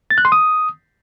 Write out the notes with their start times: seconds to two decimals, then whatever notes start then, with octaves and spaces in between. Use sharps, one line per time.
0.10 A6
0.18 F#6
0.25 C6
0.32 D#6